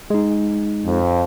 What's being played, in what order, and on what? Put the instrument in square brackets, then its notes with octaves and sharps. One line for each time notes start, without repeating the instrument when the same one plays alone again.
[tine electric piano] G#3 D#4
[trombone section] F2